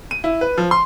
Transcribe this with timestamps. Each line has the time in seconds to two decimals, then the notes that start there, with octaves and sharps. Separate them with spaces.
0.11 D#7
0.24 E4
0.41 B4
0.58 F3
0.71 C6